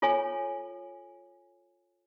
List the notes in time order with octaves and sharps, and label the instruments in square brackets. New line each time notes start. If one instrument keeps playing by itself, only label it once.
[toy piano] F4 A4 C#5 G#5